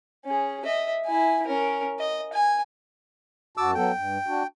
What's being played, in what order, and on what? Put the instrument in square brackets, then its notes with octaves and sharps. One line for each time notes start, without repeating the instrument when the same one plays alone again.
[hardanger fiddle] C#4 G#4
D#5 E5
E4 G#5
C#4 A#4
D#5
G#5
[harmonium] F#2 F#4 A5 [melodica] D6 E6
[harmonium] F#3 B3 A4 [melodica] G5
[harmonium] G2
D4 F#4